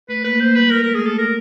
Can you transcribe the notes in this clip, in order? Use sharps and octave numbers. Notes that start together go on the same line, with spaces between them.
A3 B4
A#3 B4
A#3 C5
G3 B4
A#4
A#4
G#3
A3 G#4
A4
A#4